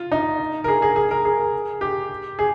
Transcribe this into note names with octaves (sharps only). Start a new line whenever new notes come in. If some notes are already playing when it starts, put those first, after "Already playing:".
Already playing: F4
D#4
A#4
G#4
G#4
G#4
A#4
G#4
G4
G#4